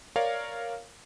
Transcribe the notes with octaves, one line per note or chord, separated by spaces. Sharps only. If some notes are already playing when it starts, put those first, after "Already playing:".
A#4 C#5 D5 F5